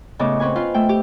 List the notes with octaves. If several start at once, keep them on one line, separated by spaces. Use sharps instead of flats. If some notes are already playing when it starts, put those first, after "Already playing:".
A2 C#3 B3 D#5 D6
C4 C#4 B4 G#5
F4 B4 C5 F5
A3 E5 G5
G4